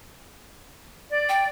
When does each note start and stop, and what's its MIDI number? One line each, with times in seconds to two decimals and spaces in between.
1.10 1.47 74
1.29 1.45 79